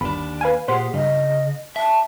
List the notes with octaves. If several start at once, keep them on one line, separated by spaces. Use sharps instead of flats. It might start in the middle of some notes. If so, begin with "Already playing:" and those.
G1 D#2 D4 B5
B4 F5 G#5
A#2 G4 G#4 C5 F#5 C6
G2 C#3 D#5
E5 A5